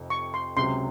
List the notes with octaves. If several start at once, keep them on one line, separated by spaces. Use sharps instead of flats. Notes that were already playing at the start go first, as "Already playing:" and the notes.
Already playing: F1 F2 C3
C#6
C6
C#2 C3 F#3 C6